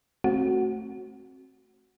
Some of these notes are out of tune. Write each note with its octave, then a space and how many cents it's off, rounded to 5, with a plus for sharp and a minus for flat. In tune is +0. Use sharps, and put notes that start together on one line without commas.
A3 +0 C4 +30 F#4 +0